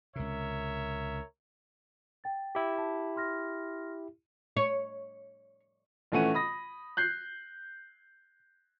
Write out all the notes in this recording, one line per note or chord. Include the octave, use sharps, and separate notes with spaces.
C#2 C3 A#4 C#5 E5
G5 A6
E4 G4
A5
C6 F6 A#6
C#5
A#1 E3 A3 C#4 F#5 D#7
B5 D#6 A#6
F#6 G6 C7